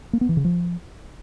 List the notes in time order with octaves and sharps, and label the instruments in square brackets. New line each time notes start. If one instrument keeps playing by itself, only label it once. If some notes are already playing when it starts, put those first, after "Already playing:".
[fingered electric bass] A#3
B3
E3
C#3
F3